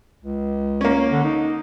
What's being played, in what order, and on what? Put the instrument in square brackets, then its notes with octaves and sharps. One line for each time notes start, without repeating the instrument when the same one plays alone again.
[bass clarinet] C#2
[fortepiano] A#3 C#4
[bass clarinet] D3
D#4